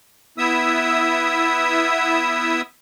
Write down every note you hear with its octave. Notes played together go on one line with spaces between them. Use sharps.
B3 E4 E5 D#6 E6